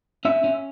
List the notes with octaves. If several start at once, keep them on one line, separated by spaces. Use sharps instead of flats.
C#4 E5
C#4